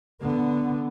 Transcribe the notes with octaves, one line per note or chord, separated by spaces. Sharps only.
D3 B3